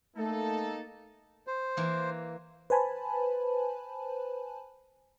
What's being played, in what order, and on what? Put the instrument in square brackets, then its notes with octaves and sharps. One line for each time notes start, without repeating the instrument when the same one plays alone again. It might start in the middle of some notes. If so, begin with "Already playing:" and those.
[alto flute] A3 [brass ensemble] A#3 D#4 A4
[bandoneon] C5
[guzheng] E3 A#3
[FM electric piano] B4 C5 G#5 A5 B5